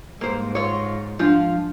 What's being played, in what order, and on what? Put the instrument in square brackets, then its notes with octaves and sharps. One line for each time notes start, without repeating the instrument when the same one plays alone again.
[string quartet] G#2 [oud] A#3 C5
[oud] F4 C#5
[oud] F3 F4 [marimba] G#3 D4